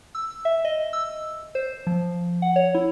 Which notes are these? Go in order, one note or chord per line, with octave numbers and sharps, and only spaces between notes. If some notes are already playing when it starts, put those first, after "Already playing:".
E6
E5
D#5
E6
C5
F3
F#5
C#5
E4